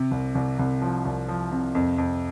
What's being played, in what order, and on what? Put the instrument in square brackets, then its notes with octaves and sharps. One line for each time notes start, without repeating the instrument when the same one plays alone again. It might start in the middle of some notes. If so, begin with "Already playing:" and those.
Already playing: [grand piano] C3
C2
C2
C2
F3
C2
F3
C3
F2
F2